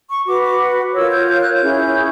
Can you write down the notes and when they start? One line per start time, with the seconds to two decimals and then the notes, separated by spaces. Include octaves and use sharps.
0.09 C#6
0.25 F#4 B4 D6
0.43 D6
0.94 F4 A#4 C#5 E6
1.11 G6
1.27 G6
1.40 F#6
1.53 G6
1.61 C#4 E4 G#4